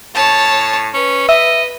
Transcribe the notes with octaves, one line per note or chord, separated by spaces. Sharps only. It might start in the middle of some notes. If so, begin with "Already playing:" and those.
A2 C#5 A5
C#4 B4
D#5 E5